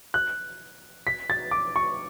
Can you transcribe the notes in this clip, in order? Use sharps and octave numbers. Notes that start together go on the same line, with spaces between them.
F#6
B6
A6
D6
C#6